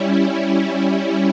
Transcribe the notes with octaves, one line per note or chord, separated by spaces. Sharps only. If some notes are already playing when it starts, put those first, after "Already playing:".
Already playing: G3 C#4 E4